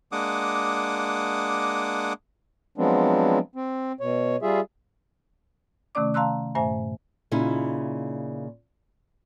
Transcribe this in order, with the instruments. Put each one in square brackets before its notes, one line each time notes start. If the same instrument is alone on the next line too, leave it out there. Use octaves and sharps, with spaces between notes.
[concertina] G#3 A#3 D4 F#5 D6 D#6
[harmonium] F3 F#3 G#3 B3 C4 D4
C4
B2 C#5
G3 F4 G#4 E5
[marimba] C3 D#3 A3 C#4 D5 D6
F5 A5 A#5 C6 E6 F#6
G2 A#2 A3 C5 E5 G#5
[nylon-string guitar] A#2 C#3 D#4 E4